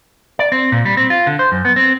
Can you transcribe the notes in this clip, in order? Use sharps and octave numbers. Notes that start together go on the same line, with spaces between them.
D5
C4
A#2
G3
C4
F4
D3
C5
F#2
B3
C4